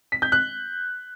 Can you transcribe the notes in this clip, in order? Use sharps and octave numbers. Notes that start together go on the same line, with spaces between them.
B6
G6
F#6